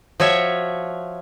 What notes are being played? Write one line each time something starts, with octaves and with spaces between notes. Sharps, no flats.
F3 F#4 C#5 E5